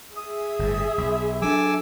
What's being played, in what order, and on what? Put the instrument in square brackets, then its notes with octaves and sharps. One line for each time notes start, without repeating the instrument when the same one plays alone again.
[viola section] G#4 E5 [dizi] D#6
[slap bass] G1 A2
B1
[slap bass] F#3 D4 [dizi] A4 [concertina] G#5 D6 E6